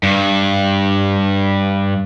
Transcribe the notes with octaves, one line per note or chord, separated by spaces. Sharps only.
G2